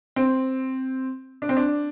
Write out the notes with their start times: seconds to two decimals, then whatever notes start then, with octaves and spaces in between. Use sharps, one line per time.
0.16 C4
1.42 D4
1.49 C4
1.57 D4